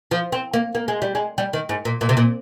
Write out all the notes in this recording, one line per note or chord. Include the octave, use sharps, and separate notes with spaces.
F3
C4
A#3
A#3
G#3
G3
G#3
G3
D#3
G#2
A#2
A#2
C3
A#2